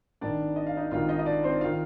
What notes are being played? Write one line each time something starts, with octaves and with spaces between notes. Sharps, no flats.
G#1 G#2 D#3 D4 D5
D#5
F5
D#4 D#5
G#1 G#2 D#3 F4 F5
D#4 D#5
D#5
D4 D5
C4 C5
D#3 F4 F5